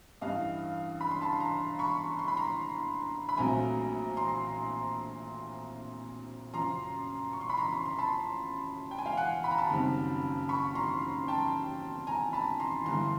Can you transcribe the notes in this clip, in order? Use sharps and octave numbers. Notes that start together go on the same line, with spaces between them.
A1 G2 E3 G3 D#5 F5
B5
C6
A5 B5
A#5 C6
B5 C#6
C6
B5
A#5 C6
B5
A#1 A#2 F#3 A3 C4 G#5 A#5
A#5 C6
F#2 C#3 F3 A#5 C6
C#6
C6
B5
A#5 C6
B5
C6
A5 B5
G5
G#5
F5 G5
F#5 G#5
B5
A#5
A5 B5
F#1 F#2 D#3 G3 C4
B5 C#6
A#5 C6
G5 A5
G#5 A#5
A5 B5
A#5 C6
G1 G2 E3 A#5 C6